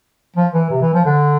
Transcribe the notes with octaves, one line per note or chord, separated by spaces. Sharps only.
F3
E3
C3
E3
F3
D3